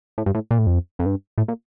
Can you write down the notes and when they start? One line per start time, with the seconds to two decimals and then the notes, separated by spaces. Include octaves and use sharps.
0.18 A2
0.26 G2
0.35 A2
0.51 A#2
0.59 A2
0.67 F2
0.99 F2
1.06 G2
1.38 A2
1.48 A#2